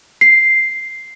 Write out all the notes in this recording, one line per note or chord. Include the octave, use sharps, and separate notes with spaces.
C7